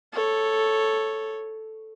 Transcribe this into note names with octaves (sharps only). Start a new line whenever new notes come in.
A4 C#5